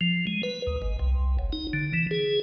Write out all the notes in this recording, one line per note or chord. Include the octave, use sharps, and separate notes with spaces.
F3
G#3
B4
D#2
G#1
C2
F#1
D#4
D3
E3
G#4